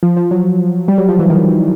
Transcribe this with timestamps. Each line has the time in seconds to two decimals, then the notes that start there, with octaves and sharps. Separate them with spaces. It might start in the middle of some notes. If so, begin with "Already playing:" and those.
0.03 F3
0.17 F3
0.31 F#3
0.88 G3
0.98 F#3
1.09 F3
1.19 E3
1.30 D#3